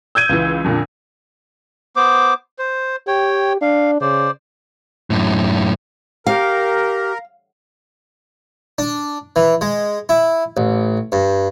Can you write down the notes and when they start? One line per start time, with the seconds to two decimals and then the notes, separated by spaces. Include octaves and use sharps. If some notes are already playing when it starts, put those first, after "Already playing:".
0.15 E6 G6 G#6 D#7
0.29 C#2 E3
0.64 F2 A#2 D3
1.96 B3 C5 D6
2.59 C5
3.07 G4 C#5 G5
3.62 D4 F5
4.01 C#3 C5 D5
5.10 F#2 A2
6.26 G4 A#4 F5
8.78 D4
9.36 E3
9.61 G#3
10.09 E4
10.57 A1
11.12 G2